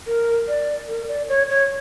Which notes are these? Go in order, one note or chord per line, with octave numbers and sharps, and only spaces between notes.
A#4
D5
A#4
D5
C#5
C#5